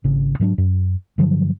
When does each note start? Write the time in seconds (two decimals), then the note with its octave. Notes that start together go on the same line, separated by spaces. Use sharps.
0.04 G#1 C#3
0.40 G#2 F#3 C4 D4
0.58 F#2
1.18 G2 D3 F3 F#3